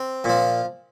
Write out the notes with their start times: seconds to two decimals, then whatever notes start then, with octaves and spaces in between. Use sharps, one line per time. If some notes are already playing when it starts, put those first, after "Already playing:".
Already playing: C4
0.24 A#2 F3